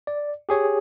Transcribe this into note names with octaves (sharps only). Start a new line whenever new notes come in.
D5
G4 G#4 C#5